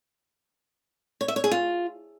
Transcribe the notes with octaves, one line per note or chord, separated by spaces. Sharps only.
C#5
E5
C#5
G#4
F4